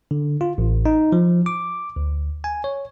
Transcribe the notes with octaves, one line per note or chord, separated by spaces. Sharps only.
D3
F4
A1
D#4
F3
D6
D2
G#5
C#5